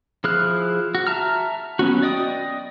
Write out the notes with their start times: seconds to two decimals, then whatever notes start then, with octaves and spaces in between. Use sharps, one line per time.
0.24 F3 E4 G#4 F6 F#6
0.95 F#4
1.07 E5 A5 A#5 F6
1.79 F#3 B3 C#4 F#4
2.02 D5 D#5 G5 D#6